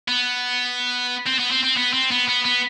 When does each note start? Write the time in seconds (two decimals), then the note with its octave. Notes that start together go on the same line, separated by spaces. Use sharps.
0.08 B3
1.27 C4
1.39 B3
1.52 C4
1.64 C4
1.77 B3
1.94 C4
2.11 B3
2.28 B3
2.45 B3